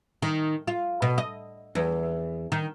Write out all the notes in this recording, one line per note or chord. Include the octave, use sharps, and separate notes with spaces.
D#3
F4
B2
D#5
E2
D#3